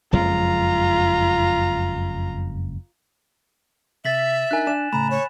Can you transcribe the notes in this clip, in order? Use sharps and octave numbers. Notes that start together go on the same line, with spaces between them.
F#1 F2 G#3 F4 A#5
C3 E5 A6 B6 F#7
D4 D#4 A#4 G#5 F#6
D4 E7
A2 C#3 A3 A#5 B5 E7
C#5